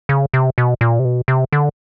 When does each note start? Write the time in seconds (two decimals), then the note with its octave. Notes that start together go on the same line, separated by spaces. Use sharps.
0.09 C#3
0.34 C3
0.58 B2
0.81 A#2
0.99 C3
1.05 B2
1.28 C3
1.53 D3